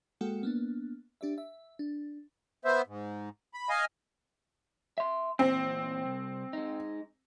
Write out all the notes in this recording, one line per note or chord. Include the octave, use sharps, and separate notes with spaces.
G#3 A#3 F#4 A4 F#5 G5
A#3 B3 D4
D4 G4 D5 E5
E5
D4
B3 C5 E5
G#2
B5
D#5 F5 G#5
E5 C6
E2 A#2 E3 C4
C2
G#3 D#4